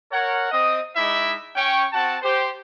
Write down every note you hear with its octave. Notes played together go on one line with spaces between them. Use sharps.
A#4 C#5 F#5
C4 D#5 D#6
G#3 D#4 E4 E5 B5 D6
C#4 G5 C#6
C4 F#4 F#5 A5
G4 C5